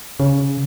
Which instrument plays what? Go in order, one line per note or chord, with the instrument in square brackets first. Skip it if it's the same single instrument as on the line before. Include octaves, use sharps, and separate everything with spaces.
[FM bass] C#3